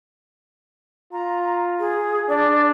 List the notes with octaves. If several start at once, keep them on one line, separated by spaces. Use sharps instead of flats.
F4 A#5
G#4
D4 D5